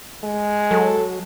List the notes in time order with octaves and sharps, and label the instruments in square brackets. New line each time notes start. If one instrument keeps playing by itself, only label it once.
[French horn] G#3
[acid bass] F#3 [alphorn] A4